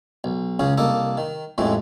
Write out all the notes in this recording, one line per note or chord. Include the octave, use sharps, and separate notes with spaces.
B1
C#2 C#3 C#4 G#4
C2 A#3 A4 D#5
D#3
A1 F2 A2 E3 G#3 A3